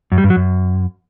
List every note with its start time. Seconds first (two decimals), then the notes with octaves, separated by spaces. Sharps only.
0.12 F#2
0.18 G3
0.24 G2
0.30 F#3
0.36 F#2